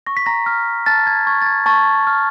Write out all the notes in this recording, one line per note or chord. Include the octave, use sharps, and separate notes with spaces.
C#6 A#6
B6
A#5 A#6
F6
A5 F6 A6
G#6
C#6 G#6
A6
G#6
A5 C#6 A6
F6